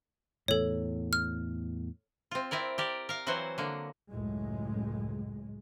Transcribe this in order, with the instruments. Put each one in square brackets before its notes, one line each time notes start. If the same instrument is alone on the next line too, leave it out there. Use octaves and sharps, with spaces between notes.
[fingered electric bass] E2 A2 [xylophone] A4 C#5
[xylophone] F6
[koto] C4 F4
C4 E4 A#4 D5
G4 A#4 D5
A#4 F5
E3 F#3 C4 F#4 C5
D3 A#3
[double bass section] C#2 F#2 A2 G#3